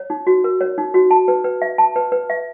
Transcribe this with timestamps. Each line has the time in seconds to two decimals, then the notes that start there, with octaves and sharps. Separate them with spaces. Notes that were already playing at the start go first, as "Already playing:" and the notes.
Already playing: C#5
0.10 D#4
0.27 F#4
0.44 A#4
0.61 C#5
0.78 D#4
0.94 F#4
1.11 A5
1.28 B4
1.44 B4
1.62 E5
1.78 A5
1.96 B4
2.12 B4
2.30 E5